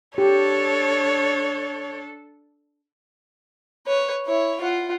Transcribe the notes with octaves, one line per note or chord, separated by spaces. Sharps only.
D4 G4 A4 C#5
B4 C#5
E4 C#5
F4 F#5